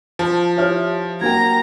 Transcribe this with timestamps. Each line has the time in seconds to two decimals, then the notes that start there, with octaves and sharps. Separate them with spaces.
0.19 F3 A5
0.57 E4 G4 C#5 E5 F6
1.21 F#3 A#3 G5 A#5 G#6